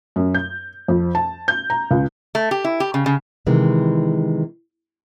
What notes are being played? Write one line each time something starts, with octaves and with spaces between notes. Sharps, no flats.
F#2
G6
F2
A5
G6
A#5
C#2
A3
G4
E4
G4
C#3
C#3
C3 D#3 E3 G#3